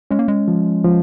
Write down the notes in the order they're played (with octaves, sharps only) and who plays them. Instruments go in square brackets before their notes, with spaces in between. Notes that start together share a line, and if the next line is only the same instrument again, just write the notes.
[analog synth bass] G#3 [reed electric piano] C#4
[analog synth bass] A#3
G#3
[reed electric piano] F3
F3